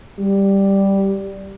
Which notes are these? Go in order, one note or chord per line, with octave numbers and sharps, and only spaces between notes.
G3